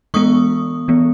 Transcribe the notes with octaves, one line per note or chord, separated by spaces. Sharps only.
E3 G#3 B3 C#6 D#6
E3 G#3 B3